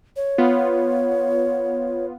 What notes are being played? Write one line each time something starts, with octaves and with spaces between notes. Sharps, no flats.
C#5
B3 F4